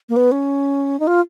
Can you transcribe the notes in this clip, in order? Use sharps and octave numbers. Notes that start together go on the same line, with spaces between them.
A#3
B3
C#4
D#4
F4